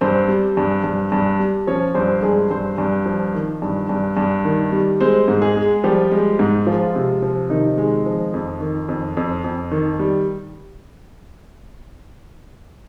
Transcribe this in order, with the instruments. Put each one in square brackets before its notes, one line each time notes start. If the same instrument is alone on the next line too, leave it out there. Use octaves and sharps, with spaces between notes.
[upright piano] G2 C4 C5
G3
G2
G2
G2
G3
F3 C#4 C#5
G2 C4 C5
G2 G#3 G#4
G2 C4 C5
G2
F3
D#3
G2
G2
G2
D#3
G3
G#3 C4 C5
G#2
G#3 G#4
G#3
F3 G3 G4
G#3
G#2
F3 G#3 F4
C3
F3
C3 D#3 D#4
G#3
F3
F2
D#3
F2
F2
F2
D#3
G3